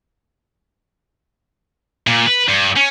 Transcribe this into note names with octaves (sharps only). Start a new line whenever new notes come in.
A#2
B4
G2
C#4